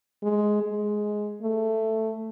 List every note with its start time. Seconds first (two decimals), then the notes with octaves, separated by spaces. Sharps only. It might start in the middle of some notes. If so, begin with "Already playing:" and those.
0.23 G#3
0.63 G#3
1.42 A3